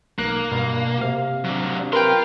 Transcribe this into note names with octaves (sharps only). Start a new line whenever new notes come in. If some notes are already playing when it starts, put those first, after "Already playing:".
B1 A#3 F#6
G2 B2
C3 F5
F#3 D4
A#4 B4 F5 G5 C6